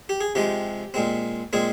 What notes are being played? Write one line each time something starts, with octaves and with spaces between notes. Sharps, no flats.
G4
G#4
C3 F3 G#3 G4
A#2 G#3 C4
A#2 G#3 C4 G#4